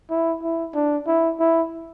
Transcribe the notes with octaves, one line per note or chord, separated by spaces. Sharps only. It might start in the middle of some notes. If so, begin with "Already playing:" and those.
E4
E4
D4
E4
E4